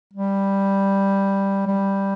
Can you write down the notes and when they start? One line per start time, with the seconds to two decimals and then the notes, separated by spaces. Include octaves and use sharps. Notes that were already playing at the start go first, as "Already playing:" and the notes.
0.14 G3
1.67 G3